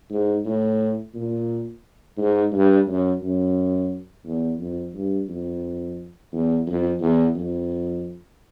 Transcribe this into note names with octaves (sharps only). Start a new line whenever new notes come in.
G#2
A2
A#2
G#2
G2
F#2
F#2
E2
F2
G2
F2
E2
F2
E2
F2